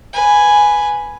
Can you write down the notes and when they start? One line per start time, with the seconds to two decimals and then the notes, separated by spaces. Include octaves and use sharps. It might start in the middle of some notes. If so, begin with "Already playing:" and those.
0.13 B4 G#5